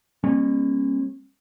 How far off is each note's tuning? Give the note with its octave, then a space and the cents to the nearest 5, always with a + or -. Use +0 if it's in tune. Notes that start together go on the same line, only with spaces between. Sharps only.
G3 +45 A#3 +30 C#4 -30